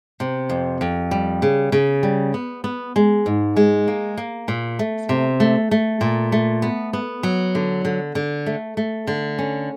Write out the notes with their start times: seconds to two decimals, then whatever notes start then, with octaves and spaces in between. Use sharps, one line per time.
0.20 C3
0.49 F2
0.81 F2
1.11 G3
1.42 C#3
1.72 C#3
2.03 G3
2.34 B3
2.64 B3
2.96 G#3
3.26 G#2
3.57 G#3
3.88 A#3
4.17 A#3
4.48 A#2
4.79 A3
5.09 C3
5.40 A3
5.71 A3
6.01 A#2
6.32 A3
6.62 B3
6.93 B3
7.23 F#3
7.55 D3
7.85 D3
8.15 D3
8.46 A3
8.77 A3
9.07 D3
9.39 C#4